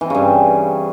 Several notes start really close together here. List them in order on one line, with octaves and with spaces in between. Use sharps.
E3 C4 C#3 G2